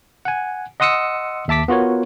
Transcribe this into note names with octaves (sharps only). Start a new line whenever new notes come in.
F#5 G#5
D#5 F#5 C6 D#6 E6 C#7
D#2 E5 A5 D6 B6
B3 F4 F#4 A#4 C#5